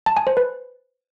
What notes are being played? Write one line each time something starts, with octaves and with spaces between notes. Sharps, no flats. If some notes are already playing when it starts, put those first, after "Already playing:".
A5
G#5
C5
B4